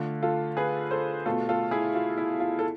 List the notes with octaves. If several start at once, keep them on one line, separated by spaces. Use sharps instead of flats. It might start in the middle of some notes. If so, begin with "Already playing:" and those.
Already playing: D3 A3 F4
F4 A4
G#4 B4
A4 C5
B2 A3 F4 A4
F4 A4
E4 G#4
F4
E4
F4
A4